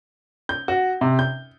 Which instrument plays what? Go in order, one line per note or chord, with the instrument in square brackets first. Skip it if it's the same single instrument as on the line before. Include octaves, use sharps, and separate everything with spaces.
[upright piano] G6
F#4
C3
G6